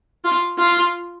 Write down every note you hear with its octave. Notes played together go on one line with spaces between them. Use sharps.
F4
F4